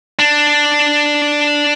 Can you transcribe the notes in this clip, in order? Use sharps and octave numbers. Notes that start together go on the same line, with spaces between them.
D4